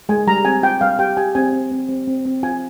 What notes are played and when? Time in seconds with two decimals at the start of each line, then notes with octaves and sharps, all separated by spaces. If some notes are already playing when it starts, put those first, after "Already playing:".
0.09 G#3 G#5
0.27 G3 A#5
0.45 C4 G#5
0.63 F4 G5
0.81 G3 F5
0.99 G4 G5
1.17 G4 G#5
1.35 C4 G#5
1.53 C4
1.72 C4
1.89 C4
2.07 C4
2.25 C4
2.43 F4 G#5